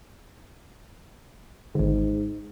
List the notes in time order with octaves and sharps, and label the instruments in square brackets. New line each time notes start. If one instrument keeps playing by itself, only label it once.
[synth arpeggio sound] G#1 D3 [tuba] G#2